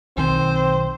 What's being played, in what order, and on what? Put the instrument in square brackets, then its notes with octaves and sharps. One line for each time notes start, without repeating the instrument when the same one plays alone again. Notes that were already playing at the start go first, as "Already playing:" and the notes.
[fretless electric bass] B1 D#3 [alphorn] C4 [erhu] C5